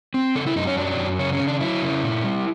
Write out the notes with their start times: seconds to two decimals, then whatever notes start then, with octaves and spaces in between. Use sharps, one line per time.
0.14 C4
0.35 C#3 A4
0.46 E4
0.56 F#2 D#4
0.67 C#4
0.77 F#3 D4
0.98 F#2
1.19 C#3 C#4
1.33 C#4
1.40 C#3
1.47 D4
1.61 F#3 E4
1.82 C#3
2.03 A#2
2.24 G3